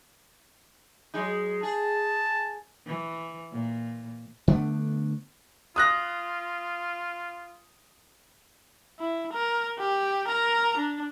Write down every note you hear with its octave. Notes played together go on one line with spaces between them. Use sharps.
F#3 G#3 D#4
G#4 A5
E3
A#2
D3 A3 B3 D4
F4 D#6 F#6 A#6
E4
A#4
G4
A#4 A#5
D4